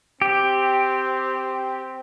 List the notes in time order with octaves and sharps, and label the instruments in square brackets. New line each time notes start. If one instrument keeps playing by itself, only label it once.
[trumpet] C4 [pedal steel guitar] G4